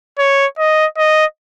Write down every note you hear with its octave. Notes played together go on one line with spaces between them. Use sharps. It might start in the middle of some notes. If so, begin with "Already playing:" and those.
C#5
D#5
D#5